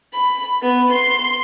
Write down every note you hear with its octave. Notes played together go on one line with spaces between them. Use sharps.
B5
B3
C6